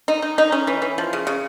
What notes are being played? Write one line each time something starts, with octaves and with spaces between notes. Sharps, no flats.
D#4
D#4
D#4
C#4
E3
E3
F3
C#3
C#3